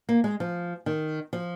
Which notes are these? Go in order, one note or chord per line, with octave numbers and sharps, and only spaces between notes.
A#3
G#3
F3
D#3
F3